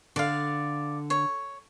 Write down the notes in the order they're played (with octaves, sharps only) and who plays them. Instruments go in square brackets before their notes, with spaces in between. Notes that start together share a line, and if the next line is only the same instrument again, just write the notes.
[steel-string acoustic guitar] D3 [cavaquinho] D5 F5
[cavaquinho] C#5